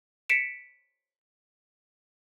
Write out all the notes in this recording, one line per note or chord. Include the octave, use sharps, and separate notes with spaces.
B6 C#7 D7 E7